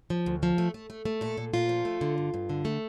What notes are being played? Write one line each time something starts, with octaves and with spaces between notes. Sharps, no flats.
F3
D2
F3
A3
A3
A3
A3
A#2 A4
A#2
A#2 F4
F3
A3
D3
G2
G2
D3
A3